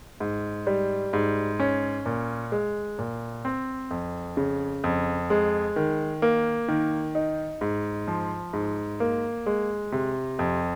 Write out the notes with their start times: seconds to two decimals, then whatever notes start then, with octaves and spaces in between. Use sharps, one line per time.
0.20 G#2
0.67 G3
1.13 G#2
1.60 C#4
2.06 A#2
2.52 G#3
2.99 A#2
3.45 C4
3.91 F2
4.37 C#3
4.84 F2
5.30 G#3
5.76 D#3
6.22 A#3
6.68 D#3
7.15 D#4
7.61 G#2
8.08 F3
8.53 G#2
9.00 A#3
9.46 G#3
9.92 C3
10.39 F2